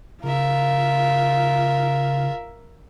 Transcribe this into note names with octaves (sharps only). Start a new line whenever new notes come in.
C#3 F4 A#4 E5